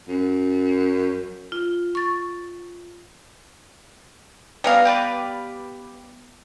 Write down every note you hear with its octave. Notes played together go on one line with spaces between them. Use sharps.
F#2
F4
C#6 A6
G3 B3 F5 G#5 A#5
G4 B4 D5